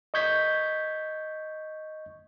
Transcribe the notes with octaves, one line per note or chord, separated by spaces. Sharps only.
D#5 C#6 G6 G#6 B6